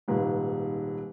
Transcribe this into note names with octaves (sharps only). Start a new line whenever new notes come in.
D#1 C#2 G#2 B4